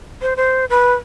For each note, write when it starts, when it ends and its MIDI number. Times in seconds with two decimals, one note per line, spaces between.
0.22 0.36 72
0.37 0.65 72
0.70 0.94 71